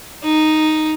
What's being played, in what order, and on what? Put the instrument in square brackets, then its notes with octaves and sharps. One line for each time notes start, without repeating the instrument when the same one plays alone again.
[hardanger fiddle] D#4